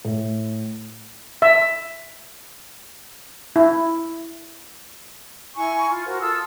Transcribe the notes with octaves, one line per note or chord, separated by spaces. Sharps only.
A2
E5
E4
E4 G#5 C#6
F4
F#4 A#4 C5
F4 A4 D#6 E6